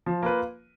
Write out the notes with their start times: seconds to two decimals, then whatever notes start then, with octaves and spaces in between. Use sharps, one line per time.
0.06 F3
0.23 A#3 F4 B4